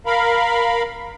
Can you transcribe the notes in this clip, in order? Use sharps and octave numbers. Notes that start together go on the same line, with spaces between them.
A#4 F5 B5